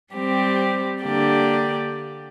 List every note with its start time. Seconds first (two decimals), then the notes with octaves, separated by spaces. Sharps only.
0.13 G3 C4 G4
1.03 D3 A#3 G4 D5